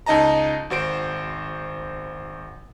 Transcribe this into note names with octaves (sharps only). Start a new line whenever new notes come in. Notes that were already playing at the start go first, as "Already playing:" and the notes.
C#2 D#4 D#5 A5 A#5
G#1 F#4 C5 D7